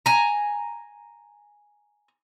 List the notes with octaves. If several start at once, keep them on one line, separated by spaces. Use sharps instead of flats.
G#5 A#5